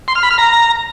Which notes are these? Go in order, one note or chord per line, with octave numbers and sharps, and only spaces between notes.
C6
F6
B5
F6
A#5